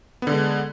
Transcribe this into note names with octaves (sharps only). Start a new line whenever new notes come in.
D3 G#3 B3